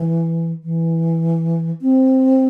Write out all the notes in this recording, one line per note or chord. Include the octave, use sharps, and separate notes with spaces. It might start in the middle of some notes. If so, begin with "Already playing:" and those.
Already playing: E3
E3
C4